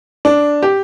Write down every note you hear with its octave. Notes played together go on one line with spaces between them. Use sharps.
D4
G4